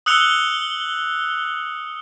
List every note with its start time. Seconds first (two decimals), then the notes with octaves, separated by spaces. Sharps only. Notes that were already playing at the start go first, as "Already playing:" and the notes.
0.06 D#6 E6 F#6 C#7 F7 G7